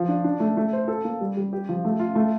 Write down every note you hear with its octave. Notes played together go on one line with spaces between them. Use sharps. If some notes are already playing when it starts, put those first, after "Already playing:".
Already playing: F3
D4
D4
A3
A3
C5
A4
A#3
G3
G3
G4
F3
A3
F4
A3